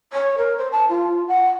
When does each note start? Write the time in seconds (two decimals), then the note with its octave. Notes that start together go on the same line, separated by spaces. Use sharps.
0.13 C#5
0.38 A#4
0.58 C5
0.72 A5
0.89 F4
1.28 F#5